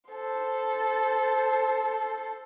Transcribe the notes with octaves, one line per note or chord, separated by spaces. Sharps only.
A4 C5